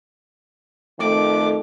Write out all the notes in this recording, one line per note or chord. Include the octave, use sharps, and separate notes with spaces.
F2 D#3 A3 D6